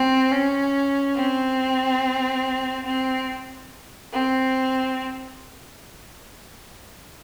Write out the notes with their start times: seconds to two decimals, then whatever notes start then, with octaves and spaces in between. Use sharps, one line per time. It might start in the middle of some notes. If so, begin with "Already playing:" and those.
Already playing: C4
0.32 C#4
1.16 C4
2.86 C4
4.13 C4